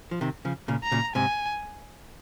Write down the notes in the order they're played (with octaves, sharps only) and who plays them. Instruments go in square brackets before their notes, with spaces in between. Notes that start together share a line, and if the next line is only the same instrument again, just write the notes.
[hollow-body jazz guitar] F3
C3 D#3
C#3 F3
A#2 C#3
[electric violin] A#5
[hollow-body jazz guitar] A#2 C#3
[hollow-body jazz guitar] G#2 C3 [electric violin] G#5